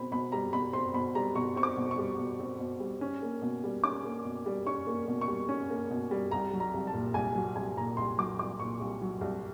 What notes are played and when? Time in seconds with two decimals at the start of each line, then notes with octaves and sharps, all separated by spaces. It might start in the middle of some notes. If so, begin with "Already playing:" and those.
Already playing: B2 C4 B5
0.11 B2 B5
0.32 G3 A#5
0.53 B2 B5
0.73 C4 C6
0.94 B2 B5
1.15 G3 A#5
1.35 B2 C#6
1.56 C4 C#6
1.63 D6
1.77 B2
1.91 C#6
1.98 G3
2.18 B2
2.40 C4
2.59 B2
2.80 G3
3.01 C#4
3.22 A#3
3.42 B2
3.64 G3
3.84 C#4 D6
4.05 A#3
4.25 B2
4.46 G3
4.67 C#4 C#6
4.87 A#3
5.08 B2
5.21 C#6
5.28 G3
5.49 C#4
5.70 A#3
5.91 B2
6.11 G3
6.31 C2 A#5
6.53 F#3
6.60 A#5
6.74 C2
6.87 A5
6.93 A#2
7.14 C2 G#5
7.35 F#3
7.56 C2 G#5
7.77 A#2 A#5
7.97 C2 C6
8.18 F#3 D6
8.39 C2 D6
8.60 A#2 C#6
8.80 C2
9.02 F#3
9.21 C2